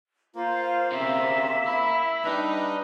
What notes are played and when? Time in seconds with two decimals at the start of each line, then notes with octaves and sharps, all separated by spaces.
0.35 A#3 F4 C5
0.92 C#3 C4 E5
1.67 E4
2.25 G3 D4 D#4 B4